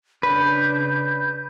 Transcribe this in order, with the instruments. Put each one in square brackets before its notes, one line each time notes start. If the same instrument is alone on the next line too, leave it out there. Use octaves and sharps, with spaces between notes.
[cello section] C#3 D4 [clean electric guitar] B4 [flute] G6